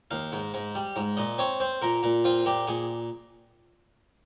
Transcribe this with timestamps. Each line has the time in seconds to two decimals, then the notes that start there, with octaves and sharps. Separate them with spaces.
0.11 D#2 F5
0.32 G#2
0.54 G#2
0.75 G3
0.96 G#2
1.17 A#2 D#5
1.38 C4 C#5
1.60 C4 C5
1.82 A#2 A#4
2.03 A#2
2.24 C4 F4
2.45 A#2 G4
2.68 A#2 G#4